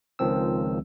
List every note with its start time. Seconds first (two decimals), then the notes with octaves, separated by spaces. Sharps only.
0.19 C#2 D#3 F3 C4 E6